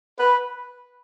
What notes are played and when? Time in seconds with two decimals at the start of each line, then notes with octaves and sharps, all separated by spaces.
0.18 B4